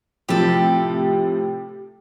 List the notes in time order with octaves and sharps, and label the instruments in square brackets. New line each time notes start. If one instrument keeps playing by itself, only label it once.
[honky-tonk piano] A2 C3 F3 [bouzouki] G4 A4